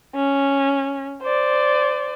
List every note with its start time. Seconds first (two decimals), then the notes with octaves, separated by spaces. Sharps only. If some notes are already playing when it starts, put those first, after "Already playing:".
0.15 C#4
1.22 C5 D5